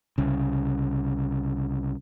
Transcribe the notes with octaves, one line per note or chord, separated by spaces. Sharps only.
C2 C#3